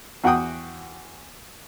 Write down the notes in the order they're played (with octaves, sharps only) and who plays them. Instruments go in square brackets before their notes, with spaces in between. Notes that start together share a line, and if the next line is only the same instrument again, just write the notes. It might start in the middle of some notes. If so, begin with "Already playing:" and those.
[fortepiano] E2 F#4 F#5 G5 D#6